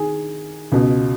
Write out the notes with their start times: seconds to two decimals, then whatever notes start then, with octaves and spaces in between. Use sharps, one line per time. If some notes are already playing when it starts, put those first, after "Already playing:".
Already playing: D#3 G#4
0.72 C#2 B2